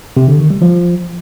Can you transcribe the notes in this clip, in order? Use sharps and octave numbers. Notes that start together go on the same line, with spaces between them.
C3
D3
D#3
G3
F3